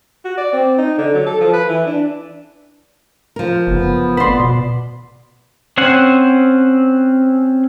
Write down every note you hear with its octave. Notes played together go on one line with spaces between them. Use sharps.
F#4
D5
C4
D#4
D3
F#3
A4
F3
B4
E3
D4
F3 A#4
F#1 B3
C5 D5 B5 C6
B2
C4 C#4 C5 F#5